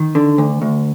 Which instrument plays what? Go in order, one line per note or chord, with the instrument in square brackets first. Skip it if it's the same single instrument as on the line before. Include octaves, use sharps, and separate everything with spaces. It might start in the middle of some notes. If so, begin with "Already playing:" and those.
Already playing: [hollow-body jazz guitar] D#3
D3
D2
D2